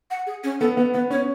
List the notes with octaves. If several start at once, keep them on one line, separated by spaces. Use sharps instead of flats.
F#5
G#4
C#4
B3 A4
B3 B4
B3 B4
C#4 C#5